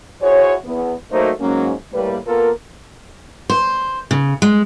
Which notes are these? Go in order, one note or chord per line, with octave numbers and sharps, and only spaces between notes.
E4 F#4 G#4 C5 C#5
E2 B3
F#3 A3 A#3 D#4 F#4 C5
G#2 F#3 A#3 C#4
A2 G3 A#3 B4
A#3 B3 F4 A4 A#4
C5
C#3
G#3